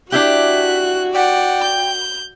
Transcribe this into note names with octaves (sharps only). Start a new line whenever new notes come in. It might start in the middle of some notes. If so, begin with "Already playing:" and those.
D4 E4 F#4 G4 E5 F#6
D5 F#5 G5
G6